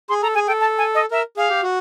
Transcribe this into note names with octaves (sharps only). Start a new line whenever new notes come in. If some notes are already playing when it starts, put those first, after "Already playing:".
G#4 C6
A4 A#5
G#4 G#5
A4 G5
A5
G#5
D#5
A#4 E5
G#4 F5
G4
F#4